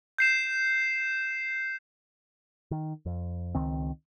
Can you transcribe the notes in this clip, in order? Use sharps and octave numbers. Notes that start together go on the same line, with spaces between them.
G6 C7 E7
D#3
F2
C#2 D#3 C4